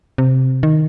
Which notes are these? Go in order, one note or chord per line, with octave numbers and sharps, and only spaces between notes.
C3
D#3